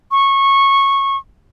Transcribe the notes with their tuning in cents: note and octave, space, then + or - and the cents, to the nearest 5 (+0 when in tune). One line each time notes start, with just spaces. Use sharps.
C#6 -15